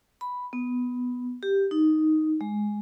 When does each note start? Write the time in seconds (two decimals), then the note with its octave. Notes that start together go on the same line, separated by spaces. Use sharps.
0.21 B5
0.53 B3
1.43 G4
1.71 D#4
2.41 G#3